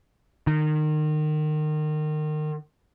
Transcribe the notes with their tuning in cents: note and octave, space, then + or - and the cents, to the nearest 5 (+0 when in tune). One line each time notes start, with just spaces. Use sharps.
D#3 -30